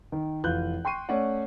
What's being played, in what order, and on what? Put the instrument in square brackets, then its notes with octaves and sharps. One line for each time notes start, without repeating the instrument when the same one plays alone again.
[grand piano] D#3
F1 E3 F4 F#6 G6
G5 C6 C#6 C7 D#7
A3 C#4 D5 F#5